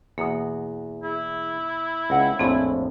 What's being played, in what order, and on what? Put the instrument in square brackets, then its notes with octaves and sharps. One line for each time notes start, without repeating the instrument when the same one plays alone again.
[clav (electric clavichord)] E2 [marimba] B2 A#3 [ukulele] F#4
[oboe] E4 [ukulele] G#4
[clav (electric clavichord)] C#2 [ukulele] D#5 F#5 G5
[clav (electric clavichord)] A#1 F2 A2 [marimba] C4 A4 [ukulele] D#4 G#5